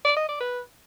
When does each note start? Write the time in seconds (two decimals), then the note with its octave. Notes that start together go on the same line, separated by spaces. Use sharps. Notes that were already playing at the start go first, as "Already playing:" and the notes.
0.05 D5
0.17 D#5
0.29 D5
0.41 B4